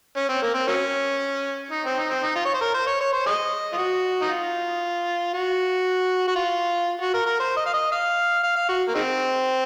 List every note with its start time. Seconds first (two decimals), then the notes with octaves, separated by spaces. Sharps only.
0.17 C#4
0.29 C4
0.42 A#3
0.54 C4
0.68 F#3 A#3 C#4
1.71 D#4
1.84 C4
1.97 D#4
2.10 C4
2.23 D#4
2.36 F4
2.46 C#5
2.54 C5
2.61 A#4
2.74 C5
2.87 C#5
3.01 C#5
3.13 C5
3.26 G#4 C5 D#5
3.73 F4
3.78 F#4
4.22 D#4
4.29 F4
5.34 F#4
6.28 F#4
6.36 F4
7.01 F#4
7.14 A#4
7.26 A#4
7.40 C5
7.57 D#5
7.66 F5
7.74 D#5
7.92 F5
8.43 F5
8.56 F5
8.69 F#4
8.88 A#3
8.95 D#3 G#3 C4